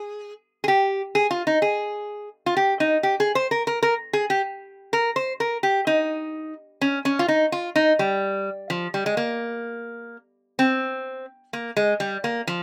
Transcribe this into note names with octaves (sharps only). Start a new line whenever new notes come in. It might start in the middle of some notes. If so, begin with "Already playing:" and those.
Already playing: G#4
G#4
G4
G#4
F4
D#4
G#4
F4
G4
D#4
G4
G#4
C5
A#4
A#4
A#4
G#4
G4
A#4
C5
A#4
G4
D#4
C#4
C#4
F4
D#4
F4
D#4
G3
F3
G3
G#3
A#3
C4
A#3
G#3
G3
A#3
F3